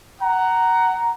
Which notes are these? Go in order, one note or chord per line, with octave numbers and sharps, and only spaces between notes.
F#5 A#5